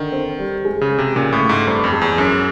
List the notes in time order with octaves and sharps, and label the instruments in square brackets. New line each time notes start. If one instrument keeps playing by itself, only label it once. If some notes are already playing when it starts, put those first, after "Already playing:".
Already playing: [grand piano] D3 [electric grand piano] D#3
[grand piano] C4
G3
G#3
[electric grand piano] C#3
[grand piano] G#3
[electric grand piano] C3
[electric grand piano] A#2 [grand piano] C#3
[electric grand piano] A2
[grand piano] A3
[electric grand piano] G#2
[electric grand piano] G2 [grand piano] C4
[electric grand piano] F2
[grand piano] G#3
[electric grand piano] E2
[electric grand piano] F#2 [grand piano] C#4